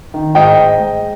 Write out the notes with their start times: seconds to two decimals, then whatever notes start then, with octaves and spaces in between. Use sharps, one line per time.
0.14 D#3
0.35 G#2 D#5 G5
0.57 G#2
0.79 G#3